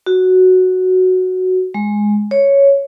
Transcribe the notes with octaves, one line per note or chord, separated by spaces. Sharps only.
F#4
G#3
C#5